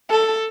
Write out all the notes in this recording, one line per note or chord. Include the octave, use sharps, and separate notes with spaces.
A4